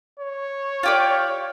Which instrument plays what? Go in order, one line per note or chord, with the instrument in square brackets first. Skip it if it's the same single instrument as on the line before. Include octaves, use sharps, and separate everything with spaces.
[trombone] C#5
[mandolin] F4 G4 D5